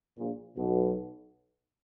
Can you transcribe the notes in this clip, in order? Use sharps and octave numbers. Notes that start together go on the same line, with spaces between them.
A#1 A#2
B1 B2